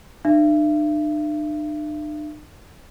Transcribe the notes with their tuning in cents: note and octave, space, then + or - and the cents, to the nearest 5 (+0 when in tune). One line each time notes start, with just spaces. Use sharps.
D4 +45 E5 +40